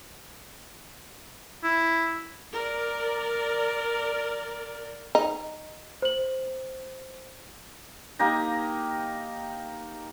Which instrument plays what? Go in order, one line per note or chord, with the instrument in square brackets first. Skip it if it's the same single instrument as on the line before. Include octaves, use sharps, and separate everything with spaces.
[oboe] E4
[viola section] A#4 D5
[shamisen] D#4
[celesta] C5 F#7
[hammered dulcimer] A#3 D#4 G4 A#5